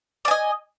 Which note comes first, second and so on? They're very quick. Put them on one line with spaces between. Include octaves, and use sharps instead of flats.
D5 G#5 D#5